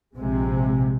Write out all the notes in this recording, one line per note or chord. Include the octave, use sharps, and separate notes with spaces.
A#1 C3 G#3